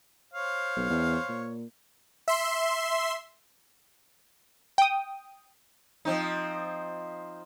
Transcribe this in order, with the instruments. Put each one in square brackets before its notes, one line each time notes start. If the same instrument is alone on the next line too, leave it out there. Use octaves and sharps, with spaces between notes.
[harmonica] C5 C#5 F5
[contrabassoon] B1
E2
A#2
[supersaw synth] E5 C6
[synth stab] G5 D#6
[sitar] F3 C4 D#4